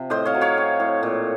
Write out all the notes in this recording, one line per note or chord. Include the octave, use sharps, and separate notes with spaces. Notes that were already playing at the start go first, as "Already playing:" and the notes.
Already playing: C3 F3
A2 C5 D#5
C#5 F5
F#3
C#5 F5
C4
A2
A#2